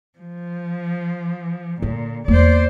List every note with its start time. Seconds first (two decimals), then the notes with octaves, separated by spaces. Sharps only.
0.19 F3
1.82 A#2 D3
2.28 E2 A#3 C5 D5